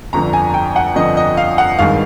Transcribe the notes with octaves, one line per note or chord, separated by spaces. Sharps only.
G1 F2 D3 F3 A#5
G#5
G5
F#5
G1 F2 D3 F3 D#5
D#5
F5
F#5
G#1 G2 D#3 G#3 F5